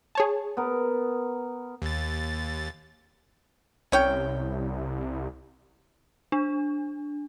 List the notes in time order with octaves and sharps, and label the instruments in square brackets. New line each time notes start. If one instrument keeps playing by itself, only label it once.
[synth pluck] G#4 C#5 A5
[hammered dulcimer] B3 A#4
[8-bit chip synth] D#2 A6
[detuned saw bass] C2 [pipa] C#4 C#5 G5
[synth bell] D4